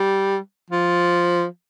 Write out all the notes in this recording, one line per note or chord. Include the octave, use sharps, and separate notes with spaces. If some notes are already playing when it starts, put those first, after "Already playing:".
Already playing: G3
F3